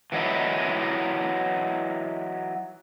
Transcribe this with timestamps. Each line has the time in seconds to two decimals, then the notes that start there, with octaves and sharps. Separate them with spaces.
0.12 E3 F#3 D#4 E4